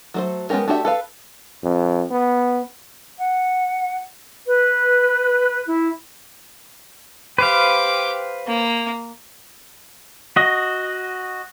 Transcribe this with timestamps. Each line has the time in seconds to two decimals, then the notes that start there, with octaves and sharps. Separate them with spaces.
0.14 F#3 A3 C5
0.50 G#3 B3 C#4 G4 A#4
0.68 A3 D4 F#4 G4 E5
0.85 A4 B4 F5
1.63 F2
2.11 B3
3.19 F#5
4.47 B4
5.66 E4
7.38 G4 B4 C5 F5 D6
8.47 A#3
10.36 F#4 D#5